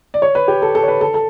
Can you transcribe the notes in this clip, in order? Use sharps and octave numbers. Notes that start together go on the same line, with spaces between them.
D5
C#5
B4
G4
A4
A4
C#5
B4
A4
A4